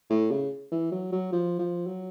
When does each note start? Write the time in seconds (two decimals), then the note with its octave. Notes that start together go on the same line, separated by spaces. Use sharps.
0.10 A2
0.31 C#3
0.72 E3
0.92 F#3
1.12 F#3
1.32 F3
1.59 F3
1.87 F#3